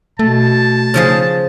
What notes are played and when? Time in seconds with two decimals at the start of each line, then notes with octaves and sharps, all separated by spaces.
0.19 B2 A3 A5
0.94 C#3 F3 G#4